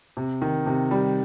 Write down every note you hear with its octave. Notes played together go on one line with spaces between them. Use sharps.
C3
D#3
C3
G3